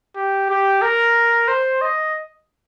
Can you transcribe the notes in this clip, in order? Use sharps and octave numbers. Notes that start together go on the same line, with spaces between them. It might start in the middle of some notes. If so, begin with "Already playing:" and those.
G4
G4
A#4
C5
D#5